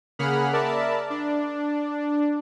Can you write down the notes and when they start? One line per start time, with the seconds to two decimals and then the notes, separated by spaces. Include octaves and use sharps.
0.19 C#3 A#3 G#4 F#5 B5 F6
0.53 A#4 D5 E5 A5 B5
1.10 D4